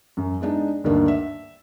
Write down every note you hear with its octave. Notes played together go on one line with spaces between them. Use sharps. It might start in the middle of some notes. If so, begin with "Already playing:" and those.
F#2
G#3 B3 D4 D#4
D2 G2 D#3 A#3 D4
E5